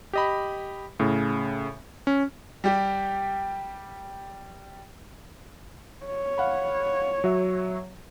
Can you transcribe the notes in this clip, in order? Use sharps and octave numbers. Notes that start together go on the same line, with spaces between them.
G4 D#5 B5
A2 C#3
C#4
G3 G4
C#5
F5 F#5 B5
F#3 F#4 E5